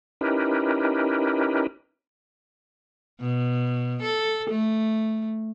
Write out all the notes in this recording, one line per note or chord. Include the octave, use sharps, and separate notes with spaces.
C#4 D#4 E4 G4 A#4 B4
B2
A4
A3